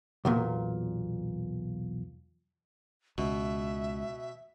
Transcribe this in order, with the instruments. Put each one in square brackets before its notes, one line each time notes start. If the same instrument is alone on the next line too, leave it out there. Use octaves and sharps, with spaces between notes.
[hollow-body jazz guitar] B1 E2 A#2
[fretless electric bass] C#2 [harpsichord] B2 [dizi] E5